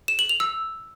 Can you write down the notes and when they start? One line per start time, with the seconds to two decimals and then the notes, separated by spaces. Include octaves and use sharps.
0.08 E7
0.19 F#7
0.29 F7
0.40 E6